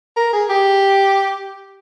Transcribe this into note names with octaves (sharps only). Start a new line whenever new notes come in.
A#4
G#4
G4